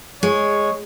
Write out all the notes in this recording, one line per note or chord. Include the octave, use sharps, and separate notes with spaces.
G#3 C#5